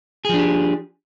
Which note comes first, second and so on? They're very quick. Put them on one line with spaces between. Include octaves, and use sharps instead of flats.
G#4 F3 D4 G4